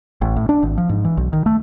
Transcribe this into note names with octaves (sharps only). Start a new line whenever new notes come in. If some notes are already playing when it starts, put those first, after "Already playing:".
A1
A2
D4
G#1
F3
G#2
E3
B1
D#3
A3